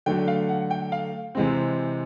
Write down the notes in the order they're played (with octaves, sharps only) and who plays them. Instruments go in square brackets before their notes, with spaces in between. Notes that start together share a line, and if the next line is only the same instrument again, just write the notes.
[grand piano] D3 F#3 A3 D4 G5
F5
F#5
G5
F5
C3 E3 G#3 C4